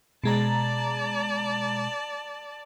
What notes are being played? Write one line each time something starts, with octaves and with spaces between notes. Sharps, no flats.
B2 G#3 D5 A5 A#5